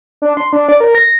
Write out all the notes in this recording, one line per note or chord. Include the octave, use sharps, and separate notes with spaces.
D4
C6
D4
D5
A#4
A#6